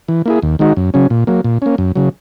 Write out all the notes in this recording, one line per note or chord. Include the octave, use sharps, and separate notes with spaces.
E3
A#3 E4 G#4
D#2
D#3 G#3 D#4 F#4
F#2
C#3 F#3 C#4
A#2
F#3 A#3
A#2
A#3 C#4
F#2
C#3 F#3